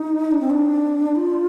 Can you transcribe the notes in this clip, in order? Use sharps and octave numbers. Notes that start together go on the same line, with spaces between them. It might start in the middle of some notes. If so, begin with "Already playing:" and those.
Already playing: D#4
D4
C4
D4
F4